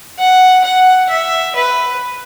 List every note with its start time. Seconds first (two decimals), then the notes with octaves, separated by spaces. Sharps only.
0.19 F#5
0.64 F#5
1.09 E5
1.55 B4